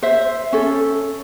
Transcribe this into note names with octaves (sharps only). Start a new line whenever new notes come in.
C5 E5
C#4 A4